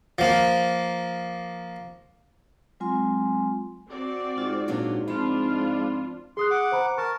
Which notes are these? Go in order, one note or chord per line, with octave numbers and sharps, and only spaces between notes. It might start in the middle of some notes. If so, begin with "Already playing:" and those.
F3 A#3
F#3 G#3 C4 F4 G#5 C6
C4 F#4 D5
G#2 F4
A#2 F#3 D4
F3 C4 D4 F4 B5
G#4 C6 D#6 F#6
F#5 D6
C5 A#5 B5
A#4 A5 C#6